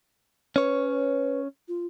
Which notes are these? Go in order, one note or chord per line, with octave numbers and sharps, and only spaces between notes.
C#4 B4 C#5
F4